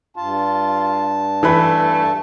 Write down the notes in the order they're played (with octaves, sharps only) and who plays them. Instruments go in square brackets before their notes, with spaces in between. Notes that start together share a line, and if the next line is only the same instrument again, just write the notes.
[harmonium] G2 A5 [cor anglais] F4
[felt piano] E3 B4 B5 [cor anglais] A3